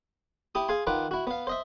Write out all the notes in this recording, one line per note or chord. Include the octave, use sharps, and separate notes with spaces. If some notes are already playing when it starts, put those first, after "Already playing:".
E4 G4 D#6
G#4 F5 G#5 C6
D#3 F4 B4 F#5 D6
E4 F#4
B3 F5
C5 D#5 E5